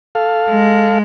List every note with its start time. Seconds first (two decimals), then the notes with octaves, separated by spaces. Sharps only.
0.15 A4 F5
0.49 G#3